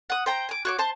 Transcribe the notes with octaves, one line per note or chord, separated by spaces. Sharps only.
F#5 D#6
C5 G5 A#5
G#5 D6
F#4 C#5 D6
C5 A5